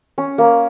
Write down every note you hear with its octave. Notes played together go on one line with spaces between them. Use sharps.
C#4
A#3